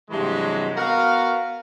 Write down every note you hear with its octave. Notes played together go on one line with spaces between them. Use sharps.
G2 C3 E3 F#3 G#3
B3 F#4 A#4 F5